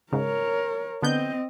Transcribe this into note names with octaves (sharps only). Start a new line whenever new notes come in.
G#2 C#3 A#4 C#5
D3 B3 C4 D#5 G6